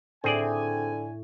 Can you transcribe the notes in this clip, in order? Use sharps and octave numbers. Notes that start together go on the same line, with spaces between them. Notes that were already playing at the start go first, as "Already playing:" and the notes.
A2 D3 C4 G#4 D5 G#5